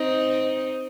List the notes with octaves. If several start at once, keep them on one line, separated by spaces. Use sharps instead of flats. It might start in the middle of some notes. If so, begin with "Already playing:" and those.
Already playing: C4 D#4